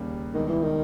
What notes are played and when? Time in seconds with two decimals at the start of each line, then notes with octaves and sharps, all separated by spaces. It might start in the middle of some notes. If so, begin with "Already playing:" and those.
Already playing: D#2 C#3 G3 A#3
0.34 C#2 B2 D#3 G3
0.49 E3
0.63 D#3